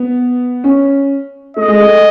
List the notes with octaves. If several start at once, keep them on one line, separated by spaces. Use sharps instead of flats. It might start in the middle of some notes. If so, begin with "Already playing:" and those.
Already playing: B3
C#4
A3 D#5
G#3
A3